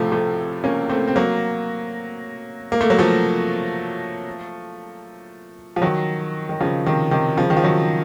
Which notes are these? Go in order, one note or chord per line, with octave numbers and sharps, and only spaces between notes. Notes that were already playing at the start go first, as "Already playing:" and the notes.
Already playing: A2 C3 F3 A3
F3 A3
A#3 C#4
A3 C4
C4
F#3 A#3
A#3
A3
F#3
F3 A3
F3
D#3 F#3
D#3
C#3 F3
C3 D#3
C3 D#3
C#3 F3
D#3
F3
D#3 F#3